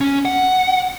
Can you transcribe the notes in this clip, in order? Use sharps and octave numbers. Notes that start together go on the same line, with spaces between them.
C#4
F#5